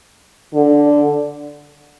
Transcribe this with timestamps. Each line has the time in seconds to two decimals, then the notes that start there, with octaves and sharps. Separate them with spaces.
0.54 D3